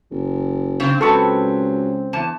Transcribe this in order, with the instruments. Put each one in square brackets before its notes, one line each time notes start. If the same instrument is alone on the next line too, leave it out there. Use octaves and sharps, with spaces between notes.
[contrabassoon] F#1
[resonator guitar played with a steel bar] C#3 [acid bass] C4
[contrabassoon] C#2 [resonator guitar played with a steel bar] F#3 B4 [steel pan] A4 C#6 E6
[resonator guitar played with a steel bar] E2 A5